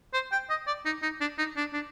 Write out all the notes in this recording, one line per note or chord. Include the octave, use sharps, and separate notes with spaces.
C5
G5
D#5
D5
D#4
D#4
D4
D#4
D4
D4